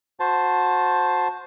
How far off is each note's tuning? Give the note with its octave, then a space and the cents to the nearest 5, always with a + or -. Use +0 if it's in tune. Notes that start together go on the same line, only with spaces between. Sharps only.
F#4 -20 C5 +5 A5 +0